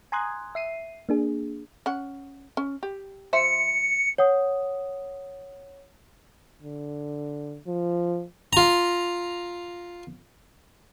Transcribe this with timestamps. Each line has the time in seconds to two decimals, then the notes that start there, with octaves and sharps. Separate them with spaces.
0.12 G#5 A#5 C6 D#6 F#6 G#6
0.55 E5 C7 D#7
1.09 A#3 D4 G#4
1.86 C#4 F#5
2.57 C#4
2.83 G4
3.33 F3 C5 E5 C#7
4.18 C#5 F#5 D#6
6.62 D3
7.67 F3
8.53 F4 A#5